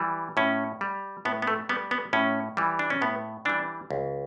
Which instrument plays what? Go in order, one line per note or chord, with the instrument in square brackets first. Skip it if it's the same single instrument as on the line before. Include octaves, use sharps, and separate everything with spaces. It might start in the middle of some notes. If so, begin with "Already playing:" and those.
Already playing: [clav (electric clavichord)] E3 G3
A2 C#4
G3
A2 B3
B3
A3
G3 B3
B3
A2 C#4
E3 G3
D4
C#4
A2 B3
E3 G3 D4
C#2